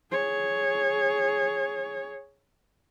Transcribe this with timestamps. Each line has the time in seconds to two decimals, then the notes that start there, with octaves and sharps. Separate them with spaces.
0.12 G#4 C#5